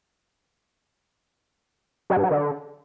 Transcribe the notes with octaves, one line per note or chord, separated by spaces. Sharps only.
F#3
G2
F#3
D3